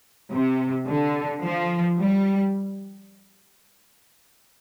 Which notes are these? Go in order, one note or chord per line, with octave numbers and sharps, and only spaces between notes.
C3
D3
F3
G3